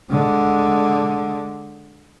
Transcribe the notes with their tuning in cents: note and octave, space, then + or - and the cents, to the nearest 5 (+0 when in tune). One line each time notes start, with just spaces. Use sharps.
D3 +0 G#3 +10